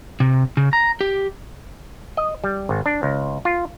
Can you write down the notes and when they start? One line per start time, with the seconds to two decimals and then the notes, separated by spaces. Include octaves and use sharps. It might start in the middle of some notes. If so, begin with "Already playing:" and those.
0.20 C3
0.57 C#3
0.73 A#5
1.01 G4
2.17 D#5
2.44 G3
2.69 G#1
2.86 D4
3.03 C#2
3.45 F4